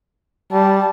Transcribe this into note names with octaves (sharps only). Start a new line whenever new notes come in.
G3 A5